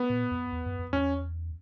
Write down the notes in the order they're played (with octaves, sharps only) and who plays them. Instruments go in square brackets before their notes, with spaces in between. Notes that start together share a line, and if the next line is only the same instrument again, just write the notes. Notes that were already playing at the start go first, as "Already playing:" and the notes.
Already playing: [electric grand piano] B3
[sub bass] A#2
F2
E2
F#2
F2
[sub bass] E2 [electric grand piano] C#4